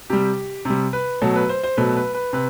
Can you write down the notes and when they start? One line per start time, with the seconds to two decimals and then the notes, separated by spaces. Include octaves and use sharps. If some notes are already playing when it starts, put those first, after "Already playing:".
0.10 C3 G3 G4
0.65 C3 G3
0.93 B4
1.22 B2 F#3 A3 A4
1.36 B4
1.49 C5
1.63 C5
1.77 B2 F#3 A3 B4
1.96 B4
2.14 B4
2.33 C3 B4